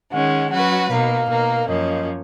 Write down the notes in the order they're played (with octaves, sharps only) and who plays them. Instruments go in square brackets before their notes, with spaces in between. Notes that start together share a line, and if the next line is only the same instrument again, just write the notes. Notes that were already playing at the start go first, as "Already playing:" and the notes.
[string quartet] D#3 G#3 C#4 [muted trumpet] F#5
[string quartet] F#3 C#4 F#4 B4 [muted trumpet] F#5
[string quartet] B2 A#3 D#4 [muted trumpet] F5
[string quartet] B2 A#3 D#4 A#4
[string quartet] F#2 F3 A#3 C#4 [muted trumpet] D#5